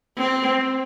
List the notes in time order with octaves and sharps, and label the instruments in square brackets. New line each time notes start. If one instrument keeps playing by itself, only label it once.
[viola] C4